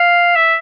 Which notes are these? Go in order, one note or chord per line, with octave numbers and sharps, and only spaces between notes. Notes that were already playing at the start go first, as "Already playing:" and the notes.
Already playing: F5
E5